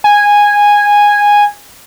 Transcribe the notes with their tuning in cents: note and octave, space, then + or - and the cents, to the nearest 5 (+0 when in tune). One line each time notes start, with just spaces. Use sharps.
G#5 -10